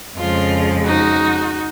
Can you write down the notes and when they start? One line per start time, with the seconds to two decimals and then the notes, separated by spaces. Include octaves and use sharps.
0.17 F2 C#3 F3 G#3 F4
0.85 D#4 F#4